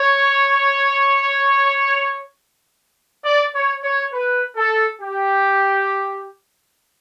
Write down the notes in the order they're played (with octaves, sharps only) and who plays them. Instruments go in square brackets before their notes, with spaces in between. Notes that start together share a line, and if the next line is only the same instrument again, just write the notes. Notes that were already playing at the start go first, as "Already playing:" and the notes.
Already playing: [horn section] C#5
D5
C#5
C#5
B4
A4
G4